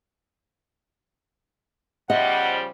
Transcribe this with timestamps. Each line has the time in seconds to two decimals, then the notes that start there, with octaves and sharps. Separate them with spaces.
2.10 C#3 F3 G3 D#5 F#5